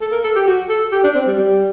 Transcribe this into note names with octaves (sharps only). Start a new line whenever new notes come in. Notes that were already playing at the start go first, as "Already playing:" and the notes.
A4
A#4
A4
G4
F#4
A4
G4
D4
C4
G3
G3